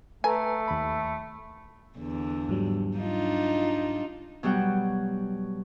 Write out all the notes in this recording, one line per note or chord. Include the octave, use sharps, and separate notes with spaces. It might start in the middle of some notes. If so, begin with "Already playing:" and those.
A3 A4 B4 G#5 A#5
D#2 B5
E2 D3
G#2 F#3 G3
D4 D#4 F4
B2 F#3 G3 F#4 F#5 G5